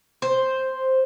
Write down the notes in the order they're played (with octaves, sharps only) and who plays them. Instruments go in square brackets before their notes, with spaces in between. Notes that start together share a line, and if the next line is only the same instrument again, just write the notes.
[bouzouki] C5